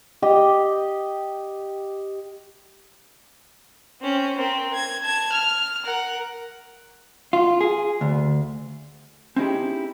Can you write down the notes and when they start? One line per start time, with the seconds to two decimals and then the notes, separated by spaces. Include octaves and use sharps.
0.22 G4 D#5 G5
4.01 C4 C#4
4.36 C4 A#4
4.73 G#6
5.04 A5 G#6
5.33 F6
5.86 A#4 F#5
7.33 F4
7.61 G#4
8.01 D2
9.36 C4 C#4 D#4 E4 G4 G#4